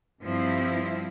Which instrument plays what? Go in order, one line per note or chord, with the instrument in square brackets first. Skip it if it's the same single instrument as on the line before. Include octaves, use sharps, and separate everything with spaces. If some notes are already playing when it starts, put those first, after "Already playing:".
[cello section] G2 F3 C4 E4